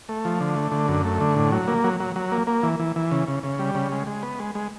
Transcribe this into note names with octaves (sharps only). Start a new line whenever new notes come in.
A3
F3
D3
A3
D3
F#2
A3
D3
A2
F#3
A#3
F#3
F#3
F#3
A#3
A#3
E3
E3
E3
C#3
C#3
C#3
G3
C#3
G#3
G#3
B3
G#3
G#3